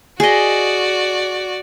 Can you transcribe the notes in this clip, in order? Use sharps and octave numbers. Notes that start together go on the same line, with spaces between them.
F#4 G#4 D5 D#5